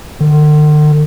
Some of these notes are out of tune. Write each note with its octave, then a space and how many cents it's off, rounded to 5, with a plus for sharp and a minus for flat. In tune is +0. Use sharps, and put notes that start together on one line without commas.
D3 +45